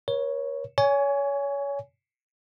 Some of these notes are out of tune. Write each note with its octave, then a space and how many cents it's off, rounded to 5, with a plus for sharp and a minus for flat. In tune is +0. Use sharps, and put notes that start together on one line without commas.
A#4 +45 C#5 +0
C#5 +25 G#5 +0